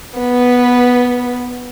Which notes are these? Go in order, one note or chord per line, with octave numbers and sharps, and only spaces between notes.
B3 B4